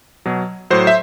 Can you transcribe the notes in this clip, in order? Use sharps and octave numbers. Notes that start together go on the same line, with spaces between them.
B2 F#3
A2 F#3 C5
E5